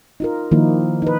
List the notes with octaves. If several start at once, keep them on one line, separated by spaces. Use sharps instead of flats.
D#4 F4 A#4
D#3 F3 A#3 D#4 E4
D#4 B4